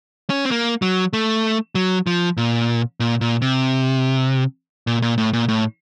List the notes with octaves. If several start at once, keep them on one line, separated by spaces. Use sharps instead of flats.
C#4
C4
A#3
F#3
A3
F#3
F3
A#2
A#2
A#2
C3
A#2
A#2
A2
A#2
A2